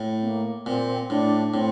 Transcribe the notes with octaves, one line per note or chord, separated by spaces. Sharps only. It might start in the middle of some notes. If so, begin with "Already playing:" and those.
Already playing: A2
C4
A#3
A#2 C4
A2 D4
A2 C4